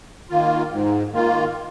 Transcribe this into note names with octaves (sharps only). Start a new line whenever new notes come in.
D#3 A#3 F4
G#2
D#3 A#3 F4